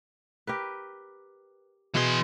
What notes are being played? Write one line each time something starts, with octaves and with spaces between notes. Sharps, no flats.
G4 A#4 B4
B2 E3 G#4 C6